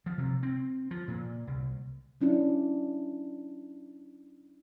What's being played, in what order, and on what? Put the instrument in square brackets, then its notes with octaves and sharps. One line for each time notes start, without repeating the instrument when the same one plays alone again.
[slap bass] F3
C3
C4
F3
A#2
C2
[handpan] F#3 C#4 D4 E4